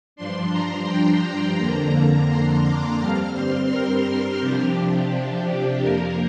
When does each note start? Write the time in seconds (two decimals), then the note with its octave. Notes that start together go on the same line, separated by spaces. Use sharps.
0.16 G2 F3 D4 C6
0.51 A#5
0.87 G5
1.22 A#5
1.58 F2 D3 A#3 D4
2.28 C6
2.63 D6
2.98 G2 G3 C4 F6
3.35 C6
3.70 A#4
4.05 A#4
4.40 C3 F3 D4 G4
4.76 G4
5.82 F2 F3 A#3 A#4